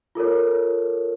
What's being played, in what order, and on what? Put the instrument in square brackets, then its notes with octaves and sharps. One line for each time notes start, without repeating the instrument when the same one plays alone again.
[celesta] F4 A4 A#4 C#5